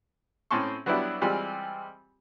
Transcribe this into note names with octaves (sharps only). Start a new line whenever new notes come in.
A2 C4 C#4 A5 C6 C#6
F#3 G3 B3 D4 E4 G4
E3 G3 G#3 C4 F4 G4